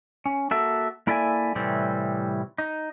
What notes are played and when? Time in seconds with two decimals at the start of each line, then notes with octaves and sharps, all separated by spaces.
0.26 C#4
0.51 A#3 F#4 A4 E5
1.07 A#3 E4 A4 D5 E5 G#5
1.55 A2 C3 E3 G3 C4
2.58 D#4